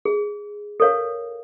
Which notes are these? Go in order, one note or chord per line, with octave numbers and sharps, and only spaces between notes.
G#4
A4 A#4 C#5 F5